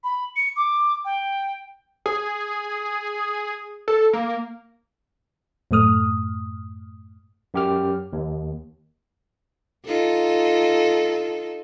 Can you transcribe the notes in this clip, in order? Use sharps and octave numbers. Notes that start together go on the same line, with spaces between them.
B5
C#7
D6
G5
G#4
A4
A#3
F#2 A2 A3 D#6 F6
F#2 G4 F6
D#2
D#4 F4 A4